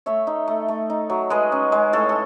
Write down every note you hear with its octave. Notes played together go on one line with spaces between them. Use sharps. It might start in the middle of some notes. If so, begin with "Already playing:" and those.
A3 C#5 E5
D#4
A3
A3
D#4
F#3
G#3 B4 D#5
C#4
G#3
A2 A4 C#5
A4